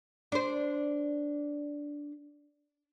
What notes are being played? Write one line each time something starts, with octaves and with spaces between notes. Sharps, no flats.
D4 C5